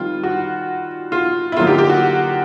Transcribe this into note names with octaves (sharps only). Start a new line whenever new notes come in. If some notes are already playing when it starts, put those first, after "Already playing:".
Already playing: D#3 G3 C4 F4
F#4
F4
E4
D3 F#3 A#3 D#4 F4
G4
G4
F#4